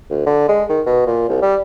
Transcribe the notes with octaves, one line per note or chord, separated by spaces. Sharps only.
D2
D3
G#3
D#3
B2
A#2
C2
G3